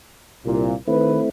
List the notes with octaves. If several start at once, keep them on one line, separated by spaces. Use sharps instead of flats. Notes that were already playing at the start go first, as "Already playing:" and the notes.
C2 A#2
D#3 A3 C4 E4 B4